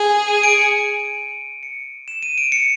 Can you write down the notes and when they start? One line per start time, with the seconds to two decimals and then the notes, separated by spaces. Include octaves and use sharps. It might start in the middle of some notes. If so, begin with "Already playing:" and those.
Already playing: G#4
0.28 D#7
0.43 D7
0.58 C#7
1.63 C#7
2.08 E7
2.23 D#7
2.38 D7
2.52 C#7